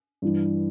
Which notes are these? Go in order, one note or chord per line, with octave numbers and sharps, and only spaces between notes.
G2 E3